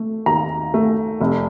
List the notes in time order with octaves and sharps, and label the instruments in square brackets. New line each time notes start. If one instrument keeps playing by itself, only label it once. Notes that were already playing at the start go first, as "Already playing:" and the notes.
Already playing: [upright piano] A3
D#2 A#5
A3
F1